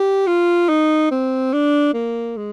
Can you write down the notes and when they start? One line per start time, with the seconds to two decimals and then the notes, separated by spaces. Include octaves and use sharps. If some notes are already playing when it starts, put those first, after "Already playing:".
Already playing: G4
0.27 F4
0.69 D#4
1.11 C4
1.53 D4
1.94 A#3
2.37 G#3